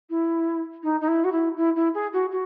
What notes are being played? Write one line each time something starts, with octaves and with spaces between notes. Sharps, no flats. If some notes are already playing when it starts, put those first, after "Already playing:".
E4
D#4
D#4
E4
F#4
E4
E4
E4
G#4
F#4
F#4